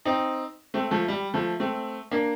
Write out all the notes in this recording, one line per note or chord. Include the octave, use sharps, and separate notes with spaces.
C4 D#4
A3 C4
F3 A3
G3
F3 A3
A3 C4
A#3 D4